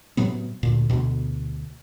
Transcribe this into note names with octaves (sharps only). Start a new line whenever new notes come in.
A2 C3 F#3 B3
D2 A#2
D2 B2